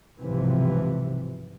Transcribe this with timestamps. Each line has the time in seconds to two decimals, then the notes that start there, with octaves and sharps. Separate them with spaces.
0.21 B1 G#2 C3 E3 F3